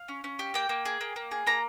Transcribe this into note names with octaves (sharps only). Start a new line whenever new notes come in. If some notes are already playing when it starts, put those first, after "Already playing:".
Already playing: F5
C#4
C#4
G4
A#3 G5
A#3
G#4
A#3
A#3
G#4
A#3 A#5